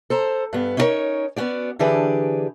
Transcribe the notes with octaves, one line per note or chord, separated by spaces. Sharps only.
A4 C5 A#5
G2 B3
C#4 D#4 E4 F#4 A#4 C#5
B3 C#4 F#4 G4 D5
D3 E3 D4 G4 G#4 B4